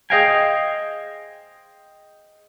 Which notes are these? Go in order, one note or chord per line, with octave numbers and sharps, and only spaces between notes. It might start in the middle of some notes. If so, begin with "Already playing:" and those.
G#4 C5 D#5 F5 G5 G#5